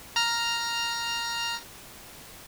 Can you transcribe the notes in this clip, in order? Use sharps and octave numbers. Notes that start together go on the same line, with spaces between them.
A#5 F6